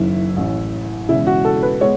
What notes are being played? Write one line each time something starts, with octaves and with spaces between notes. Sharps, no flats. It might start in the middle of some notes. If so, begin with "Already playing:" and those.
Already playing: F#1 F#2 D#3 E4
A1 A2 E3
E1 E2 C#3 E4
F#4
A4
B4
G#3 B3 C#5